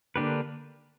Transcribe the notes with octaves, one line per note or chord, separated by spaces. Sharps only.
D3 A#3 D4 G4 B4